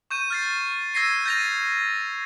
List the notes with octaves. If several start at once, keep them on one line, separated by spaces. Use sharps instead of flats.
C#6 G6 D#7
F6 A6 C7
E6 G#6 A#6 C7 D#7
G6 A6 A#6 D#7 F7